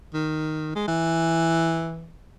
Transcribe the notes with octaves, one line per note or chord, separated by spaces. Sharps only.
D#3
G#3
E3